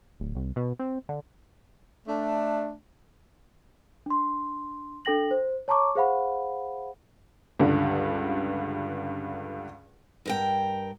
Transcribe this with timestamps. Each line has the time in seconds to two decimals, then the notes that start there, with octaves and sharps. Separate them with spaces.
0.20 D1
0.35 C2
0.56 B2
0.79 C4
1.09 D3
2.07 A3 D4
4.06 D4 C6
5.05 D4 A4 G5 A#6 F#7
5.31 C5
5.68 C#5 A5 A#5 C#6 D6
5.95 G#4 C5 F5 F#5 B5
7.59 C#2 G2 D3
10.26 G2 A#4 G5